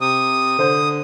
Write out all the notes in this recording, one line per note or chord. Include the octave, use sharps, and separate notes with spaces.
C3 D#6
D3 C5